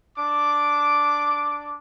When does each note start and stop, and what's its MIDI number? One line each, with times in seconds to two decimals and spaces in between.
0.17 1.75 62
0.17 1.75 86